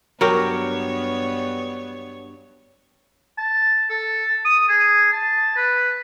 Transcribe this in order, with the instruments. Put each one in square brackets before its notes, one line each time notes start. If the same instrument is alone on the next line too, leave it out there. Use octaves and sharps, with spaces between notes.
[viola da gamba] G2 B3 C#5 [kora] F#3 G4 A#4
[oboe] A5
A4
D#6
G#4
A5
B4